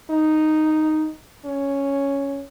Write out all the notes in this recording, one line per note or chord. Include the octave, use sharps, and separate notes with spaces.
D#4
C#4